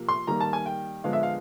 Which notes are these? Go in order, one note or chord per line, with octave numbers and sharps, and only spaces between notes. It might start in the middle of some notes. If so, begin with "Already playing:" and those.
Already playing: C3 F3 A#3
C6
D#3 G3 A#3 A#5
A5
G#5
G5
D3 F3 G#3 B3 F5
E5
F5